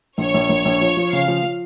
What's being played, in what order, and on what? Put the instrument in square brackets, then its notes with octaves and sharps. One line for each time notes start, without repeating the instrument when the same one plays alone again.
[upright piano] A#1 [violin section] C#5
[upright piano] A#1
A#1
A#1
F3
F3
[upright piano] C#3 [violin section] F5
[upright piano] F3
F3